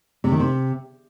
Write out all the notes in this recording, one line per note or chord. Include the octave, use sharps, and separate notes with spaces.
C3
D#3
C3